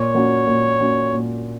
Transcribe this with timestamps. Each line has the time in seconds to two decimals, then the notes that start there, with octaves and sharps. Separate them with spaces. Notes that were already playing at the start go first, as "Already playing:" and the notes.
Already playing: A#2 C#5
0.15 A#3 C#4 F#4
0.47 A#2
0.80 A#3 C#4 F#4
1.13 A#2